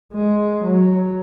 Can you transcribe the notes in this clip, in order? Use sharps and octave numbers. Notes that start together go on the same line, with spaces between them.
G#3
F#3